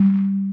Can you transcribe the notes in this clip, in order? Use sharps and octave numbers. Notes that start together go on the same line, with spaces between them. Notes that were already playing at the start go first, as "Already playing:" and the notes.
Already playing: G3